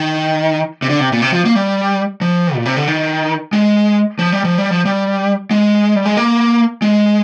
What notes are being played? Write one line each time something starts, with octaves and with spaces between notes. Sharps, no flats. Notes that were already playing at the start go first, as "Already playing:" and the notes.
Already playing: D#3
C3
D3
C3
A#2
C3
F3
A#3
G3
F3
A#2
C3
D3
D#3
G#3
F3
G3
F3
G3
F3
G3
G#3
G3
G#3
A#3
G#3